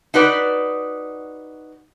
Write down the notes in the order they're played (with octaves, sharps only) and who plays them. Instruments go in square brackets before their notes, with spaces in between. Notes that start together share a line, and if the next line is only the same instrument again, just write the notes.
[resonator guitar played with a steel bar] D#4 F#4 B4 D5